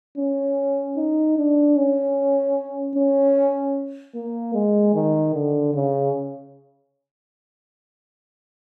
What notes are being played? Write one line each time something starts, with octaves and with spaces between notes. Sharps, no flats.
C#4
D#4
D4
C#4
C#4
A#3
G#3
D#3
D3
C#3